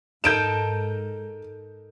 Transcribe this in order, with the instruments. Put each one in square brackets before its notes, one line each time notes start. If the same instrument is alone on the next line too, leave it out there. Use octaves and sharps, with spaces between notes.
[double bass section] G#2 [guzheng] D#4 A4 A#4 [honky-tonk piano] G6 D7 E7